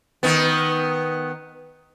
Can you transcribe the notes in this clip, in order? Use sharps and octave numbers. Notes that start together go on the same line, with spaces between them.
D#3 B3